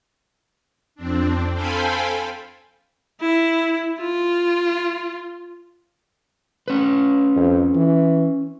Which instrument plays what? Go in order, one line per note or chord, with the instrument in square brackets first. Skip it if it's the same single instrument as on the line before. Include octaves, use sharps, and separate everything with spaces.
[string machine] F2 C4 D4
A4 C5 F5 G5 G#5 B5
[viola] E4
F4
[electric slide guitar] C#4 B4
[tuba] F2
E3